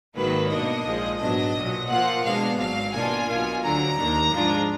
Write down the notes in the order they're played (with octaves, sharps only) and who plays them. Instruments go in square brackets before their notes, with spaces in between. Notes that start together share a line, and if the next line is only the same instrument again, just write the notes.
[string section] G#1 G#2 D#3 F#3 A#3 B4
B2 A#3 D4 D#5
A#1 A#2 F3 G#3
A#1 G#2 F#3 B3 D4 D#5
B1 A#2 F#3
A#2 F3 A#3 F4 F#5
B2 G#3 B3 D4 F5
G#1 G#2 F#3 F5
B2 A#3 D4 F4 G#5
B1 B2 A#3 F4
D2 D3 F#3 A#5
D#2 D#3 A#3 D4
G#2 F3 G#3 D4 F4